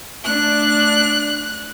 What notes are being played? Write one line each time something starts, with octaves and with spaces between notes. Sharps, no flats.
A3 D4 F#6